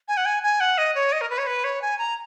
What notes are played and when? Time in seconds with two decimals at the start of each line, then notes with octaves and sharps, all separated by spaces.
0.08 G#5
0.17 F#5
0.25 G#5
0.43 G#5
0.60 F#5
0.78 D#5
0.95 C#5
1.12 D#5
1.21 A#4
1.30 B4
1.38 C#5
1.47 B4
1.64 C#5
1.82 G#5
1.99 A#5